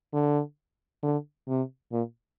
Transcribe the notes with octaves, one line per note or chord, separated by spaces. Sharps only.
D3
D3
C3
A#2